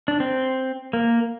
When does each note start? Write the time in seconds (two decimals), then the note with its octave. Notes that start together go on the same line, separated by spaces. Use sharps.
0.08 D4
0.20 C4
0.93 A#3